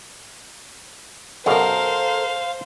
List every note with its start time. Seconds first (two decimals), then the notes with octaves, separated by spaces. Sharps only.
1.46 F#2 B2 A4 A#4 C5 F5